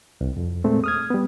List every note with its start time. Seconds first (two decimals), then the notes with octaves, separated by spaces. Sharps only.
0.21 C2
0.37 F2
0.64 A#2 G#3 A3 C4
0.84 D#6 F6 G#6
1.10 G3 B3